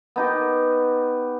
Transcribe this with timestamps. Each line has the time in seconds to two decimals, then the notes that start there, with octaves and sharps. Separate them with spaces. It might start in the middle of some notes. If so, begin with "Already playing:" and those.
0.16 B3 D#4 G4